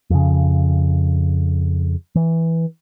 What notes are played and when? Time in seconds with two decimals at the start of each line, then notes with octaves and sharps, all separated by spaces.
0.10 F2 C#3
2.16 E3